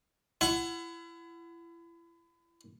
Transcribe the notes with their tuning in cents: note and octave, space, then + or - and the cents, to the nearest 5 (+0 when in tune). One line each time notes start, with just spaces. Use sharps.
E4 +35 F#5 +0